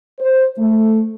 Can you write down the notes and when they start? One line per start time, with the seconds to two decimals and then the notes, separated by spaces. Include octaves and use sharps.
0.19 C5
0.59 A3